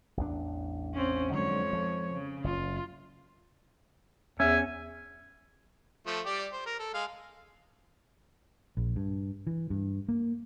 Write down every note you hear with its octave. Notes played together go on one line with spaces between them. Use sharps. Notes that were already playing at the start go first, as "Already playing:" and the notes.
A1 E2 D4
C4 C#4
F2 G#2 D3 F#3 G#3 C#5
F3
C#3
F#1 F4
E2 C#4 E5 G#5
F3 A3
G3 G4 D5
C5
A#4
A4
G#3 F5
A#1
G2
E3
G2
A#3